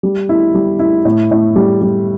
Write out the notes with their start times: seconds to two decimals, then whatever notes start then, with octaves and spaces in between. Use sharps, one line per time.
0.03 G3
0.29 E4
0.54 G3
0.79 E4
1.05 A2
1.31 A2
1.56 G3
1.82 G3